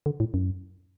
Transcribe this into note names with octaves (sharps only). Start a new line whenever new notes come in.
D3
A2
F#2